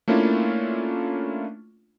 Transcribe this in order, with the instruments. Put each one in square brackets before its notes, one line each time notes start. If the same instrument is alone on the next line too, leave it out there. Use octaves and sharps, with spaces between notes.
[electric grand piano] A3 A#3 C#4 D4 E4 F4